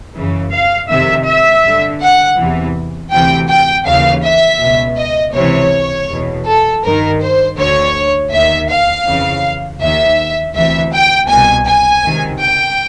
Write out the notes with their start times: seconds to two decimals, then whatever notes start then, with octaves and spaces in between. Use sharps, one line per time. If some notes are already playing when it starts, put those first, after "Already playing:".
0.15 F#2 C#3 E3
0.52 F5
0.89 F2 C3 D#3 E5
1.26 E5
1.64 G2 D3
2.01 F#5
2.38 E2 C3 E3
3.12 D2 C3 E3 G5
3.49 G5
3.86 D#2 C#3 E3 F5
4.24 E5
4.60 C#2 B2
4.98 D#5
5.35 C#2 C3 E3 C#5
6.09 E2 B2
6.46 A4
6.83 G2 D#3 A#4
7.20 C5
7.57 D2 D3 C#5
8.32 D#2 D#3 E5
8.69 F5
9.05 F2 C#3 E3
9.80 D#2 D#3 E5
10.54 D2 C3 E3 E5
10.92 G5
11.28 C2 B2 G#5
11.66 G#5
12.03 C#2 C3 D#3
12.40 G5